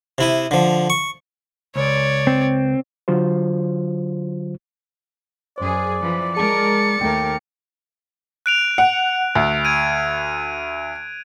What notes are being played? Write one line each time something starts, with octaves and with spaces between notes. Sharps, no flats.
C3 E4 D#6
D3 F3
C#6
C#2 C#5 D5
C4
D3 F#3 F4 C5
F#2 G#4 C5 D5
E3 F3 B4
G#3 G#4 A#4 A5 A6 C#7
D#2 A3 A#4 G5 D6
F#6 D7 F7
F#5
D2
G#6 D7 D#7